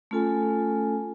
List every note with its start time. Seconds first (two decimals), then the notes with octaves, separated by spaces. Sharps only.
0.11 A3 C#4 F4 A4 G#5